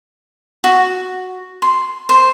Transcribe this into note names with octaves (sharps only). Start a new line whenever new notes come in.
F#4
C6
C5